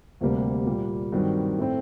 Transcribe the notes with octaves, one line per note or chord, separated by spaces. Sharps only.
D2 C3 G3 A#3
A#2 G3 A#3
G2 D#3 F#3 C4 F#4
A2 A3 C4